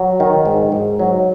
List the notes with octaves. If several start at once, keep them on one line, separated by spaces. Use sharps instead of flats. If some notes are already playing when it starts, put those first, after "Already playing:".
Already playing: F#3
D#3
G#2
G#2
F#3